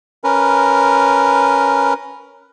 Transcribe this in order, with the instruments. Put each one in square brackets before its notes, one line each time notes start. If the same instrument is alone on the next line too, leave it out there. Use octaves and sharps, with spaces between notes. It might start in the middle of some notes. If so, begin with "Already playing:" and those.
[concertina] C#4 A#4 B4